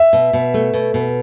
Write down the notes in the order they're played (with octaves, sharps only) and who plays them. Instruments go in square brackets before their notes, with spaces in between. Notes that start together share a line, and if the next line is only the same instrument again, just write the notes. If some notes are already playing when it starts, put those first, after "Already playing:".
Already playing: [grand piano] E5
[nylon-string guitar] B2
B2
A3
B2
B2